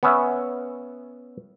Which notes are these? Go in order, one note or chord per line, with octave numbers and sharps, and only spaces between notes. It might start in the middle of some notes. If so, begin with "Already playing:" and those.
B3 C#4 E5